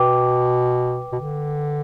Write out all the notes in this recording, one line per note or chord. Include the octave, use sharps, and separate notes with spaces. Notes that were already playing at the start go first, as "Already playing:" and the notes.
Already playing: B2 B4 G5 D6
B2
D3